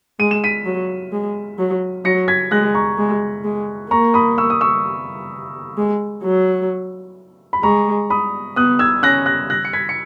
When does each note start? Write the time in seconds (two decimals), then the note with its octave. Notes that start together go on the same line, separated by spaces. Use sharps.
0.20 G#3 D#7
0.31 E7
0.44 B6 D#7
0.65 F#3
1.12 G#3
1.59 F#3
2.05 F#3 A#6 C#7
2.28 G#6 B6
2.51 G#3 F#6 A#6
2.74 A#5 C#6
2.98 G#3
3.44 G#3
3.91 A#3 A#5 C#6
4.14 B5 D#6
4.38 C#6 E6
4.50 D#6
4.61 C#6 E6
5.77 G#3
6.23 F#3
7.53 B5
7.63 G#3 A#5 C#6
8.10 B5 D#6
8.56 B3 D#6 F#6
8.79 E6 G#6
9.03 C#4 F#6 A#6
9.26 F#6 A#6
9.50 F#6 A#6
9.65 C#7
9.73 G#6 B6
9.89 C#7